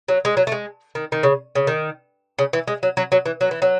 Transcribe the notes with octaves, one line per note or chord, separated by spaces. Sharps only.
F#3
G#3
F#3
A3
G#3
D#3
D#3
C#3
C#3
D#3
C#3
E3
G#3
F#3
F#3
F#3
E3
F#3
E3
F#3